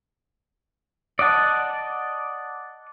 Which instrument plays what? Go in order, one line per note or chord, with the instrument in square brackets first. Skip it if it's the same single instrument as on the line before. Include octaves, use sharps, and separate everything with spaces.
[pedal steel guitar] D5 D#5 F#5 A5